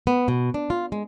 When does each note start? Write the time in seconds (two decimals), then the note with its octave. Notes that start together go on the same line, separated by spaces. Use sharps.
0.07 B3
0.28 B2
0.54 D4
0.70 F4
0.92 G#3